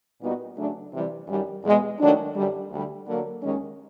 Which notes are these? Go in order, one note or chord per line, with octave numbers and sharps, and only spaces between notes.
A#2 G3 B3 D#4 F#4
C#3 F#3 A3 D4
C3 E3 G3
F#2 D#3 G3
E2 B2 G#3 B3
D#3 F#3 A3 D4
F#2 D3 G3
D2 D3 G3
D3 F#3 A#3
D#2 D#3 G#3 C#4